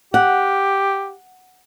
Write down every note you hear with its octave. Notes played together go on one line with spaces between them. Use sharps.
G4 F#5